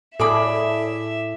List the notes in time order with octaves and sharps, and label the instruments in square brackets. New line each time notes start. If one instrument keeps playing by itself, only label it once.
[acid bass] A2 [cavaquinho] G#4 D5 B5 [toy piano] A4 [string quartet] E5